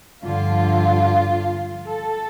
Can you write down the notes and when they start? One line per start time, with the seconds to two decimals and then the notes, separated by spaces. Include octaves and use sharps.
0.23 G2 D3 F3 F4
1.88 A4